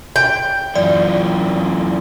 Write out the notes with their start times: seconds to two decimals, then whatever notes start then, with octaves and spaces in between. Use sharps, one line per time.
0.16 G5
0.75 F#2 E3 F4 D5